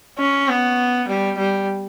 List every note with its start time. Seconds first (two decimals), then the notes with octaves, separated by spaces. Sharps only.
0.18 C#4
0.48 B3
1.08 G3
1.38 G3